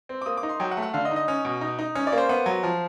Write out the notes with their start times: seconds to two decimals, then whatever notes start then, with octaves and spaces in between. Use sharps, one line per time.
0.09 C4
0.22 D6
0.26 A#3 D#6
0.37 D6
0.43 D#4
0.49 C6
0.60 F#3 G5
0.71 F#5
0.77 A3
0.82 F#5
0.94 D3 F5
1.05 D#5
1.11 D#4
1.16 D#5
1.28 C#4
1.45 B2
1.61 D#4
1.79 D#4
1.95 C#4
2.07 D5
2.12 A#3
2.18 C5
2.29 B3
2.46 F#3
2.63 F3